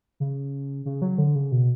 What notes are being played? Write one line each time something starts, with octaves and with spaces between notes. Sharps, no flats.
C#3
C#3
F#3
D3
C#3
B2